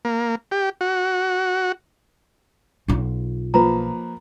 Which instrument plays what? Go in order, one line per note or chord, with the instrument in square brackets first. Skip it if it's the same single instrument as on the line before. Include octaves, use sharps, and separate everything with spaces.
[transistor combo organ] A#3
G4
F#4
[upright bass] B1 F4
[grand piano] F3 A#3 B4 [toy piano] A#5 B5